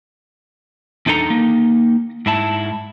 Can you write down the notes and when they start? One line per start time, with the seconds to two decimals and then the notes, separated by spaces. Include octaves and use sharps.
1.06 E2 D4 D#4 A4 A#5
1.30 A#3 D#4
2.26 G#2 E4 A5